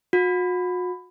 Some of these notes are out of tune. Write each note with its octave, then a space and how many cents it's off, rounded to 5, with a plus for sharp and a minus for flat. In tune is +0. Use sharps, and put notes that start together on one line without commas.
F#4 -40